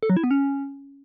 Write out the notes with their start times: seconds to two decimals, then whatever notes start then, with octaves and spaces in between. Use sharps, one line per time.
0.03 A4
0.10 F#3
0.17 E4
0.24 B3
0.31 C#4